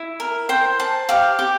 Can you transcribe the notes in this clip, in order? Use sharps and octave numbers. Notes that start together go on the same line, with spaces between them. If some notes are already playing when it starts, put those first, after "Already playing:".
Already playing: E4
A#4
C5 G5
C5 A5
G4 F5
G4